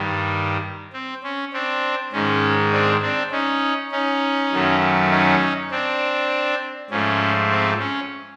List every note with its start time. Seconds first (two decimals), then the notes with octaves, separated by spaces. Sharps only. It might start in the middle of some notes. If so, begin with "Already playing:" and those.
Already playing: G2 D#3 G3
0.93 C4
1.24 C#4
1.53 C4 D4
2.13 G#2 D#3 G#3 C#4
2.72 C4 D4
3.02 C4 D4
3.32 C#4 D#4
3.92 C#4 D#4
4.52 F#2 D#3 F#3 A3
5.11 C#4 D#4
5.71 C4 D4
6.90 G#2 F3 A3 C#4
7.50 C4
7.79 C#4